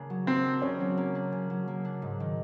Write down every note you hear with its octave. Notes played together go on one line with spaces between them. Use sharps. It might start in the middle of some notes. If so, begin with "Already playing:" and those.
Already playing: C#3 A#3 D4
F#3
A#3 C4
D4
C#3 C#4
F#3
A#3
D4
C#3
F#3
A#3
D4
G#2
D#3